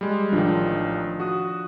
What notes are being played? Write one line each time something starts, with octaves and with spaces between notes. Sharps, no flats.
G3 G#3
A1 D#3 F3 D4 F4
F#4 D#6